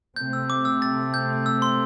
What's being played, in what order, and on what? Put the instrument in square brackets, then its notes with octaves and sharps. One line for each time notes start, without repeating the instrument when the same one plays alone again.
[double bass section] C3 A3 C4 [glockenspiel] G6
[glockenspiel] E6
D6
E6
A6
G6
E6
C6